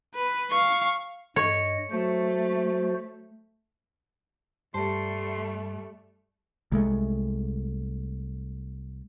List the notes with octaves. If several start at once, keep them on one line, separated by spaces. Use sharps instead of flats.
B4
F5 C#6
G2 C#5 D#5
F#3 A3 F#4 C5
G2 G3 A3 G4 A5 C6
C2 G#3 A3